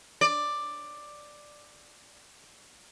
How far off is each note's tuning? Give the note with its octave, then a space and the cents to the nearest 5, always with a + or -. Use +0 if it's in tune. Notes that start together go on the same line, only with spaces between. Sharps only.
D5 +10